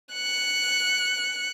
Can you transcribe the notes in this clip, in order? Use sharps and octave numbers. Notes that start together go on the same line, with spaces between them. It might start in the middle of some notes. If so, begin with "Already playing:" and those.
F#6 C#7